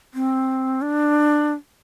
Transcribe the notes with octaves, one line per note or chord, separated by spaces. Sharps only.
C4
D4